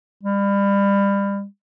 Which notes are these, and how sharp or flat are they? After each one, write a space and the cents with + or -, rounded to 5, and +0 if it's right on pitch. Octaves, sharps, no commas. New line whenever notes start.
G3 +30